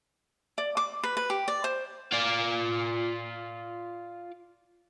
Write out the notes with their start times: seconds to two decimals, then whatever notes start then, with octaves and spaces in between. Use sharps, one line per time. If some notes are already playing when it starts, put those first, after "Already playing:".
0.58 D5
0.77 D6
1.03 B4
1.17 B4
1.30 G4
1.48 D5
1.64 C5
2.12 F4 D5